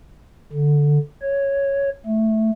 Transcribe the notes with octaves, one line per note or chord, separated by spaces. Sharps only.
D3
C#5
A3